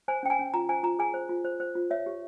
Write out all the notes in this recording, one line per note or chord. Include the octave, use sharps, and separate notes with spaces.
C5 G#5
C#4 G5
G#5
C#4
F4 A#5
C5 G#5
F4 A#5
G#4 G#5
C5
F4
C5
C5
F4
C#5 E5
G4